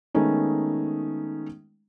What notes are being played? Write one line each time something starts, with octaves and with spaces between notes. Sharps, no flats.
D#3 G#3 A3 B3 C#4 D#4